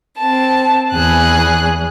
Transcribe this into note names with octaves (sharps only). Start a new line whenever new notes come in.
C4 A5
E2 G#4 F#6